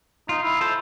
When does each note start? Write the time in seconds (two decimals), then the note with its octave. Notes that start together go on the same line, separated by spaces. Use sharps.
0.29 D#4 F4
0.43 E4
0.61 E4 A4 C5